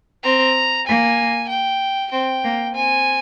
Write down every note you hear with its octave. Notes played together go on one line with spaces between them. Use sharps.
C4 A#5
A#3 G#5
G5
C4 G5
A#3
C4 G#5